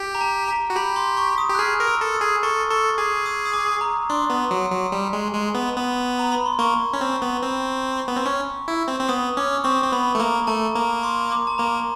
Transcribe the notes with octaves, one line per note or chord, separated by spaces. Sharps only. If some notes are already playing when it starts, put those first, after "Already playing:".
Already playing: G4
A#5
A5
A#5
F#4
G4 B5
C6
C#6
D#6
G4
F#6
G#4 F6
A#4
E6
A4
D#6
G#4
A4 C#6
A4 C#6
G#4 D6
D#6
D#6
D6
A#5
D4 C6
B3
F#3
F#3
G3
G#3
G#3
B3
B3
A#5
B5
C6
A#3 C#6
C#4
C4
B3
C4
B3
C4
C#4 C#6
E4
C4
C4
B3 D#6
C#4 D6
D6
C4 C#6
C4
B3 B5
A3
A#3 A#5
A3 A5
A#3 A#5
C6
D6
A5
A#3 A#5